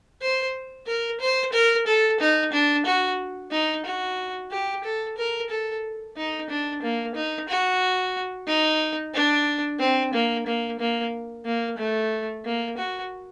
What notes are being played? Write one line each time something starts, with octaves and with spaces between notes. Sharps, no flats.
C5
A#4
C5
A#4
A4
D#4
D4
F#4
D#4
F#4
G4
A4
A#4
A4
D#4
D4
A#3
D#4
F#4
D#4
D4
C4
A#3
A#3
A#3
A#3
A3
A#3
F#4